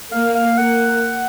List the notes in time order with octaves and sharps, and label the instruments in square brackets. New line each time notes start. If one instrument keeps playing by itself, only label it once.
[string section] A#3 [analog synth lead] F5
[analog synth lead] F5
[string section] A#3 [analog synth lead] F#5